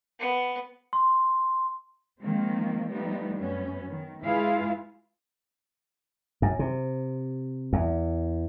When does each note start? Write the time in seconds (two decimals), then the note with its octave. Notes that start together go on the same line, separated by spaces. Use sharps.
0.19 B3
0.93 C6
2.20 D#3 F3 G#3 A#3 C4
2.91 F3 G3 A3 B3 D#4
3.38 F#2 B3 C#4
3.88 D#3
4.24 G#3 E4 F4 G#4 B4 F5
6.42 F#2
6.59 C3
7.73 E2